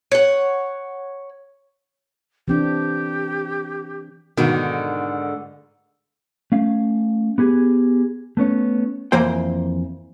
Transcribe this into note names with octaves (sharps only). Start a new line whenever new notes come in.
C#5 F#5
E3 C4 D4 G4
G#2 B2 D3 D#3
A3 C#4 F5
B3 G4 G#4
A3 B3 C#4 C#5
F2 E3 A#3 C5 G5